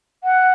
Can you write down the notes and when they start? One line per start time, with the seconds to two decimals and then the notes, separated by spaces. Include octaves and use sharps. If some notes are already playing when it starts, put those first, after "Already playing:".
0.23 F#5